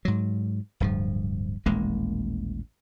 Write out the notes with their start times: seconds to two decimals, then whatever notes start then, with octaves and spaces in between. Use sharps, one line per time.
0.05 G#2 F#3
0.80 D1 G2 F3
1.66 D#1 A1 G#3 A#3